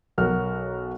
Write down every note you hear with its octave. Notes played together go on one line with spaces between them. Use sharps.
B1 F#3 F#4 A#4 F6